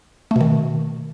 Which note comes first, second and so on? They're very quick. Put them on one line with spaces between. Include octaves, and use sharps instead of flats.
A3 B2 D#3